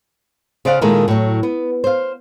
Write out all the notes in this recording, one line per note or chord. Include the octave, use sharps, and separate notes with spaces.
C#3 C5 D5 F5 F#5
A#2 D#3 G#3 A#3 E4 A4
A2 F#3
B3
C5 F5